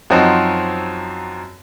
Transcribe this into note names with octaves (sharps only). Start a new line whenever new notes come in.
F#2 F3 C4 D#4 F#4